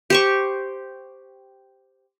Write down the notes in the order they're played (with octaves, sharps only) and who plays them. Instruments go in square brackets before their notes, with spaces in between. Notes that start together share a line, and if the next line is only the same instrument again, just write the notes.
[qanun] G4 C5 C#6